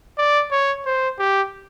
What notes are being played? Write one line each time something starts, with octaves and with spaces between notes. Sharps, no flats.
D5
C#5
C5
G4